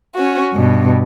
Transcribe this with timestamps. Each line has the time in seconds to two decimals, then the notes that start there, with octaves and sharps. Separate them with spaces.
0.16 C#4 F#4
0.53 G2 B2